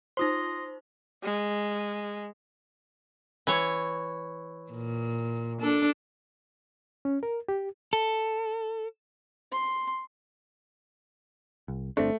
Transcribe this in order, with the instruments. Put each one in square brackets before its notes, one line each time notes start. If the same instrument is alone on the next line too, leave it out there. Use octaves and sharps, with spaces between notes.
[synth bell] D#4 F4 C5 [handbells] C6 D#6 A#6
[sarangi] G#3
[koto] E3 C#5
[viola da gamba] A#2
D4 A4
[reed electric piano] C#4
A#4
G4
[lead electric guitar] A4
[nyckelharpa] C6
[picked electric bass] C2
[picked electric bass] G1 C4 D4 [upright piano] A3